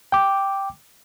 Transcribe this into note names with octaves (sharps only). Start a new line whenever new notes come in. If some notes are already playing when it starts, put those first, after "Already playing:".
G5 D6